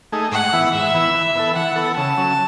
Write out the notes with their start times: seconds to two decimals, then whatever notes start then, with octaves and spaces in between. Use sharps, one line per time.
0.12 A3 D#4 G#4
0.32 G#2 F#5
0.53 E3 B3 E4
0.74 G#2 E5
0.94 E3 B3 E4
1.14 E3
1.35 B3 E4 A4
1.55 E3 F#5
1.76 B3 E4 A4
1.96 C#3 A5
2.17 F#3 C#4